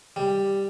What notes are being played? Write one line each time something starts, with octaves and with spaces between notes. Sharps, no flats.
G3